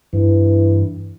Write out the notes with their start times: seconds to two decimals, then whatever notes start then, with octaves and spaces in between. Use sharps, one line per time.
0.13 G2 E3